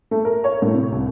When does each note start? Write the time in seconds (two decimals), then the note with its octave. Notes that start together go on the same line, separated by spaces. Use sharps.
0.11 A3
0.25 A#4
0.44 C#5
0.62 A2
0.74 C3
0.92 C2